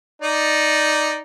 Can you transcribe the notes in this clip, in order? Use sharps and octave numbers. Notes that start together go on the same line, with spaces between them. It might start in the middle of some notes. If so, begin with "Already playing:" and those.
D#4 D5